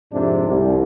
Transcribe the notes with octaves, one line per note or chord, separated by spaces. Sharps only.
F2 G#2 C3 D4
C2